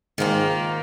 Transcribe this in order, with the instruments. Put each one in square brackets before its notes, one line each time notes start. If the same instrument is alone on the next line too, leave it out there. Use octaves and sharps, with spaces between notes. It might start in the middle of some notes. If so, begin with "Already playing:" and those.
[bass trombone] G#2 [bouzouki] D#3 A#3 F4